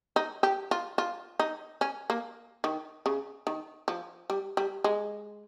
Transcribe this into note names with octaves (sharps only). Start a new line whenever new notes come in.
D#4
G4
F4
F4
D#4
C#4
A#3
D#3
C#3
D#3
F3
G3
G3
G#3